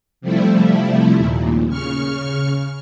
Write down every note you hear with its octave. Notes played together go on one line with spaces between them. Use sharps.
C3 F3 G3 A3 E4
D#2 A#2
C#3 C#6 F6